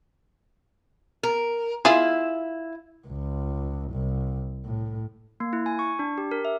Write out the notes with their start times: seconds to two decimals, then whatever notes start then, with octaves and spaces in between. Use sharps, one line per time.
1.23 A#4
1.85 E4 F4 G#4
3.08 C#2
3.92 C2
4.66 A2
5.40 A#3
5.53 E4
5.66 G#5
5.79 C#6
5.99 D4
6.18 G4
6.31 A#4
6.45 E5